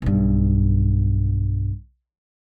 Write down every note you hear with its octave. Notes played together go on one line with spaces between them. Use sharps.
B1 G2